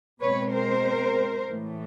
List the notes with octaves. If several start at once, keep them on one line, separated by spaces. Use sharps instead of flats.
B2 G#3 C4 B4 C#5
A#4 C5
A2 E3 A3